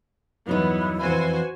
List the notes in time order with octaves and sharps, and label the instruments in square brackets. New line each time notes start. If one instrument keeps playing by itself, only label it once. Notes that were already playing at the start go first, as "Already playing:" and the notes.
[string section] E2 B3 [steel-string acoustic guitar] G2 F#3 D#4 [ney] E4
[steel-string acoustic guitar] F2 E3 [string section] F#4 C5 G#5